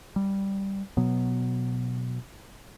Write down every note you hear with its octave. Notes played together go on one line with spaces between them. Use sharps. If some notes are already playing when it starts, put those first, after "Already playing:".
G3
B2 F#3 B3